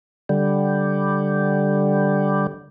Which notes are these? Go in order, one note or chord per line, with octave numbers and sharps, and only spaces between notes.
D3 G3